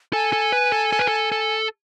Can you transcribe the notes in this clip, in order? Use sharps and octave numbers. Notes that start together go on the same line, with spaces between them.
A4 G#5
A4
B4
A4
A4
B4
A4
A4